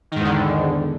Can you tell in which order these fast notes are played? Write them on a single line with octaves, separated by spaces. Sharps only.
D#3 G#2 E2 D3